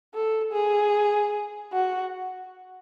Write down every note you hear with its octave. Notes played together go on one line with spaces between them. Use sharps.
A4
G#4
F#4